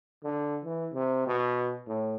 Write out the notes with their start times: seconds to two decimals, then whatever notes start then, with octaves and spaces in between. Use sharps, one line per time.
0.23 D3
0.65 E3
0.94 C3
1.26 B2
1.87 A2